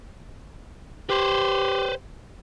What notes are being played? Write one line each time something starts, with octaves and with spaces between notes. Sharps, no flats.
G4 B4 C5